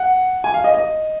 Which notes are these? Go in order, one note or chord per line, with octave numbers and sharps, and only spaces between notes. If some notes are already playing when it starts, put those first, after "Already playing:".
Already playing: F#5
G#5
F5
D#5
D#5